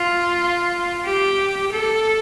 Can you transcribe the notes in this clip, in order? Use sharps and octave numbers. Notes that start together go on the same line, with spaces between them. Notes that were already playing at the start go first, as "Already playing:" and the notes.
Already playing: F4
G4
A4